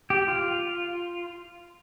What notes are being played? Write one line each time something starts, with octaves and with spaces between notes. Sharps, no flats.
G4
F4